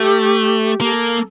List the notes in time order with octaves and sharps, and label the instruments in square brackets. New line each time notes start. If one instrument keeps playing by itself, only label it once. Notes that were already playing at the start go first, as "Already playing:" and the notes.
Already playing: [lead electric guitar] A3 [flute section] G4
[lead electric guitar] A#3 [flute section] A4